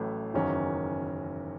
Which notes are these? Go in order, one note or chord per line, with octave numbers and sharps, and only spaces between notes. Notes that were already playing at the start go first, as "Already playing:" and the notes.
Already playing: A1 A2 F#3 A3
F#1 E2 D#3 F#3 C#4